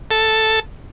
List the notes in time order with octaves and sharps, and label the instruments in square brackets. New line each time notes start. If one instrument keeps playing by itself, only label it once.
[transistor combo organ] A4